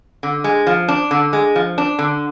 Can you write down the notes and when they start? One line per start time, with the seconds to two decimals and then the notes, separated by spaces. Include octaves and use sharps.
0.23 D3
0.44 G#3
0.67 F3
0.88 D4
1.11 D3
1.33 G#3
1.56 F3
1.78 D4
1.99 D3